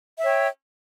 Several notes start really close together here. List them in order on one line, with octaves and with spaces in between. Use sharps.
E5 C#5 G5